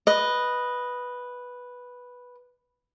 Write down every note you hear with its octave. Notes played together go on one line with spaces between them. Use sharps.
B4 D#5